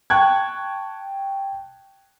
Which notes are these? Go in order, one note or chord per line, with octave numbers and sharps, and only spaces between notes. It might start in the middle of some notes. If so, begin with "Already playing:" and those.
G5 A5 C#6 F#6 G#6